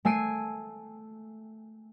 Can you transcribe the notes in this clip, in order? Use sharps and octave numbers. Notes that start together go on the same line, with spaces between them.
A3 G#5 E6 C7 D7 D#7